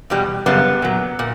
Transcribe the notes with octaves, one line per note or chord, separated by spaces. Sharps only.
E2 B2 G3
F#2 C#3 G3 B3
A#2 F#3
A#2